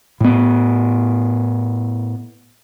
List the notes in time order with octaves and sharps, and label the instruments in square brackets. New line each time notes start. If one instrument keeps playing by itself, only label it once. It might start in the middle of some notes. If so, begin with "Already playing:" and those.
[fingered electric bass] A2 B3